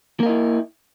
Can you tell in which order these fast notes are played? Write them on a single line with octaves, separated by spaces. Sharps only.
A#3 A#4 D#5 E4